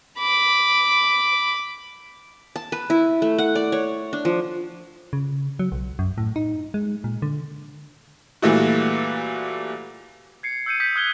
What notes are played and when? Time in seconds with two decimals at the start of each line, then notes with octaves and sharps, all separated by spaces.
0.18 B5 D6
2.56 A5
2.72 B4
2.90 E4
3.22 A3
3.38 F#5
3.55 D5
3.72 C#5
4.13 D4
4.25 F3
5.13 C#3
5.59 F#3
5.72 B1
5.99 F#2
6.18 A2
6.36 D#4
6.74 G#3
7.04 A#2
7.22 D3
8.42 A#2 E3 G3 A3 E4 F#4
10.43 G#6 C7 C#7
10.66 E6 G6 C#7 D#7
10.80 D#6 G6 B6
10.96 D#6 F6 F#6 G#6 C#7 G7